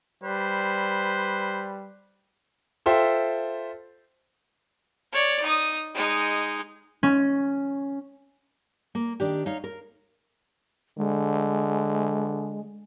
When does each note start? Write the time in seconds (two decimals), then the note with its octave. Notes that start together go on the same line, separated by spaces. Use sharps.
0.24 G3 B4 C5
2.86 F4 A4 C5 E5 G5
5.12 C#5 D5
5.43 D#4 D#6
5.94 G#3 D#4
7.03 C#4
8.95 A#3
9.20 D#3 D4 G4
9.46 D#4 C#5 F5
9.64 A#4
10.97 D3 G#3